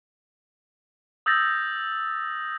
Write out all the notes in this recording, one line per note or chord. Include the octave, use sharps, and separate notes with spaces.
D#6 E6 G6 A6 A#6